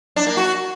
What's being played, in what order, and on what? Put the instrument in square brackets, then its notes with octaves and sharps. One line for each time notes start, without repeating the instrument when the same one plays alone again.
[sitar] D4
A#3
F#4